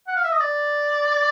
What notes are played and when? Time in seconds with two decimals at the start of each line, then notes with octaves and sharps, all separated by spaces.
0.08 F#5
0.16 F5
0.24 E5
0.32 D#5
0.40 D5